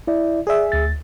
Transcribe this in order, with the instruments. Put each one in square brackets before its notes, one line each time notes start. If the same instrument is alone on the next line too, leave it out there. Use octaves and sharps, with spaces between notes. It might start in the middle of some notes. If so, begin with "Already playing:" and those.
[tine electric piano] E4 D5 E5
[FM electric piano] G#4 E5 [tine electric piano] D5 G#5
[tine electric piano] D2 A6